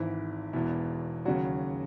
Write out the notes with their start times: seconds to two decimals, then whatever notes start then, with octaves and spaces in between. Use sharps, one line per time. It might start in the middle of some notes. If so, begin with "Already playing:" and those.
Already playing: G#1 G#2 E3 E4
0.53 E1 E2 B2 E4
1.25 D#2 C#3 F#3 F#4